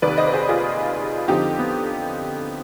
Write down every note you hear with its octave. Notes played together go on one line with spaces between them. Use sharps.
F1 D#2 D#3 B4 D5
C5 D#5
B4
G#4 C5
F4 G#4
F2 D3 F3 D#4 G4
B3